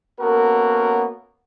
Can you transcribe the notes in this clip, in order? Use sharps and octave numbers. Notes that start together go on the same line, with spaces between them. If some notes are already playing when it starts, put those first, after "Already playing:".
A#3 B3 C#4 F#4 A4 A#4